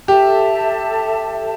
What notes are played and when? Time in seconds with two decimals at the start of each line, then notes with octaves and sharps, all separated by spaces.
0.08 G4 A4 E5 A5